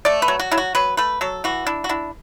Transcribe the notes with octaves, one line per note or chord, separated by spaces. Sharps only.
A3 D5
B4
F#3
F#4
F#3 E4
F#4
F#3 B4
A3 B4
F#3 A4
E3 F#4
D4 E4
F#4
D4 E4